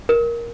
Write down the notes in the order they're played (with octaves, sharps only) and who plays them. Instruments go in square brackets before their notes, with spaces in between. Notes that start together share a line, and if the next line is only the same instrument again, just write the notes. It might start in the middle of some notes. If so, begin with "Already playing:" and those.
[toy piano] A#4